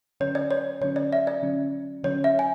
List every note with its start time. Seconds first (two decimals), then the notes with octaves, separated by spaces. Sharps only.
0.20 D3 F#3 C#4 C#5
0.35 D5
0.51 C#5
0.81 D3 F#3 C#4 C#5
0.96 D5
1.13 E5
1.27 D5
1.42 D3 F#3 C#4
2.03 D3 F#3 C#4 C#5
2.24 E5
2.39 G#5